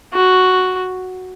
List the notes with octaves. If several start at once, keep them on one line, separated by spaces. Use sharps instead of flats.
F#4